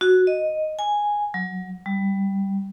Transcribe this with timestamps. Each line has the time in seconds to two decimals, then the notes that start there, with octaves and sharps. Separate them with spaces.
0.01 F#4
0.27 D#5
0.79 G#5
1.34 F#3
1.86 G3